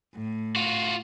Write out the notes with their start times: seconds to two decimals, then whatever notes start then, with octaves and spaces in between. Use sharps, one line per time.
0.14 A2
0.56 F4 F#4